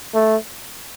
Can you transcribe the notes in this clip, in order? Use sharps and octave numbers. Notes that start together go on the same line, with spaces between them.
A3